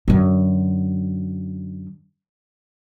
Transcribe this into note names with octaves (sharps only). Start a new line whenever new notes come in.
F#2 D3